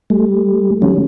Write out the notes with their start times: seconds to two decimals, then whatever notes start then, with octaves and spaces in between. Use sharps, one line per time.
0.10 G3 A3
0.82 D#3 F#3 G3 C#4